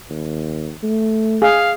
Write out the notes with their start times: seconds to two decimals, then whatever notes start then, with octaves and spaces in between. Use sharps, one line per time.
0.10 D#2
0.83 A3
1.42 G#4 F5